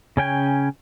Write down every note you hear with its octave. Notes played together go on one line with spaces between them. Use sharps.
C#3 C#4 G5 G#5